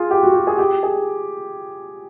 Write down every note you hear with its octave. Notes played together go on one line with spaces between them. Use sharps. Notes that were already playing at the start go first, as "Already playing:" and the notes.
Already playing: F4 G#4
G4
F#4
G4
G#4
G4
G#4